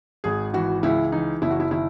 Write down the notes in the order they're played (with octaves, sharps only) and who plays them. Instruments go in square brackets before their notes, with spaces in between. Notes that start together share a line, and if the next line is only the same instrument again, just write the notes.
[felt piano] G#1 G#4
E3 F#4
C#2 E4
E3 D#4
F#1 E4
F#4
E4
D#3 E4